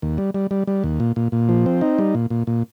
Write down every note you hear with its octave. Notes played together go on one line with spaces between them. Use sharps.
D#2
G3
G3
G3
G3
D#2
A#2
A#2
A#2
F3
C4
D#4
G3
A#2
A#2
A#2